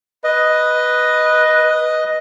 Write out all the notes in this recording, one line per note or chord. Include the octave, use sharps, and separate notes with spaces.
B4 D#5